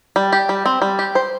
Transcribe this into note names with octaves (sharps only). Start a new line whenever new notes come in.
G3
G4
G3
C4
G3
G4
C5